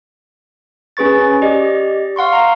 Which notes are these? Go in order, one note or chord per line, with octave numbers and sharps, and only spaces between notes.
C#4 G#4 B4 C#6 A6
G4 D5 D#5
F5 F#5 C6 C#6
A#5